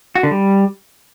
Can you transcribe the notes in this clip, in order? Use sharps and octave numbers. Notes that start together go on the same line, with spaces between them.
F#4
D3
G3